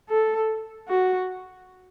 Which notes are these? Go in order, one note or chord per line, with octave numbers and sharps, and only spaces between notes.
A4
F#4